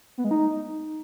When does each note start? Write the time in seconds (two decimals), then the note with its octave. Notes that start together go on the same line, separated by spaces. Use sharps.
0.18 B3
0.24 G#3
0.31 D#4